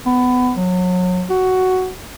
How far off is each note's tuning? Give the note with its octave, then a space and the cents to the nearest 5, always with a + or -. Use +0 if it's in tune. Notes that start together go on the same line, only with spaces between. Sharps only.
B3 +20
F#3 -30
F#4 +5